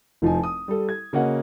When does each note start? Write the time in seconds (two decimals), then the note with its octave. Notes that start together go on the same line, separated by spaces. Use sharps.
0.22 F1 F3 D#4 G#5
0.44 D#6
0.68 G3 A4
0.89 G#6
1.13 C#3 A#3 C#4 F#4 D#5 F#5